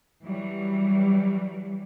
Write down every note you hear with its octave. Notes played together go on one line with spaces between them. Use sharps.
E3 F#3 G3